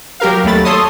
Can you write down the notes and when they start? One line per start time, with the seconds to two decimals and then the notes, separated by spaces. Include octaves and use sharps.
0.20 F#3 G4 A#4 F5
0.44 D#2 F#3 A3 B5 A6
0.65 A4 C#5 C6 D#6